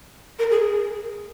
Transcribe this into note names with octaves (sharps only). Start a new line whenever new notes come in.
A#4
G#4